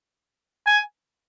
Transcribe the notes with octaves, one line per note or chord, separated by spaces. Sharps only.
G#5